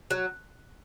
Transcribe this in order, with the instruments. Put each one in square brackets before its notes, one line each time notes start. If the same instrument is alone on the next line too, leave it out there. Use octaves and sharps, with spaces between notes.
[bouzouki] F#3